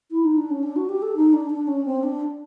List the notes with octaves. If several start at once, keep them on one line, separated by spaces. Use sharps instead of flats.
E4
D#4
D4
C#4
D4
F#4
G4
A4
D#4
D4
D4
C#4
C4
D4